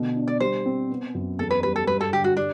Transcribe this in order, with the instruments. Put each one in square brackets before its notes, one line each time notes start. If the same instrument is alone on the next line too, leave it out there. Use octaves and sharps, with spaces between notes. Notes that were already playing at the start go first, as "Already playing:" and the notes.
Already playing: [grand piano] B2 D3 A3
D4
[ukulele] D5
[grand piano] G3 [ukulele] C5
[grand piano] C4
B3
F#2
[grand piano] E2 [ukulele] A4
[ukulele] B4
[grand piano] G3 [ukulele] B4
[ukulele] A4
[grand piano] G2 [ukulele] B4
[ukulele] A4
[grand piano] D3 [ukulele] G4
[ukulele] F#4
[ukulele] D4 [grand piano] G4